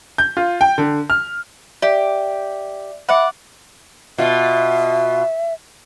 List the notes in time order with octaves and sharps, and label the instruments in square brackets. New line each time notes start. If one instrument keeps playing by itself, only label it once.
[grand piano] G6
F4
G5
D3
F6
[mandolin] G4 [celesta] D5 E5
[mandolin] D5 F#5 [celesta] E5 B5
[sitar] B2 F4 [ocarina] E5